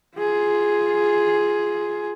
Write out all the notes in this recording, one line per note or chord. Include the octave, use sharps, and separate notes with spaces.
F4 G#4